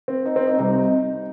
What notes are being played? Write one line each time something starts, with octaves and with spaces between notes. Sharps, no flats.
C4
D#4
C4
D#4
C2 C3 G3 D#4